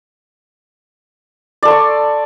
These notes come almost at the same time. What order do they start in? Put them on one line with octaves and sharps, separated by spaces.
D5 A4 C6 C#6